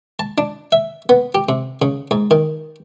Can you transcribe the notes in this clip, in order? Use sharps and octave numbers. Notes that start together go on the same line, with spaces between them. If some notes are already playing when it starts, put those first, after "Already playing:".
A5
D4
E5
B3
G4
C3
C#3
G#2
D#3